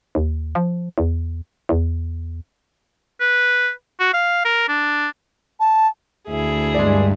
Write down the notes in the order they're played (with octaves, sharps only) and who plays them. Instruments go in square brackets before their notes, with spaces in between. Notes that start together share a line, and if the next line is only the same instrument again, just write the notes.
[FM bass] D#2
F3
E2
E2
[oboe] B4
F#4
F5
A#4
D4
[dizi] A5
[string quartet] D2 E4 G#4
[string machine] G2 [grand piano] G#3 D5